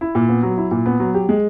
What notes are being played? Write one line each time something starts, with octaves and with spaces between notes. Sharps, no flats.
E4
A#2
B3
F#3
E4
A#2
B3
F#3
G4
G#3